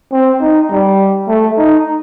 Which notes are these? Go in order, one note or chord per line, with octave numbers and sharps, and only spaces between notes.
C4
D#4
G3
A3
D#4